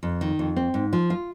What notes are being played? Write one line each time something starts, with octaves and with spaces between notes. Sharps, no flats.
F2
D#3
F2
C4
G#2
F3
F4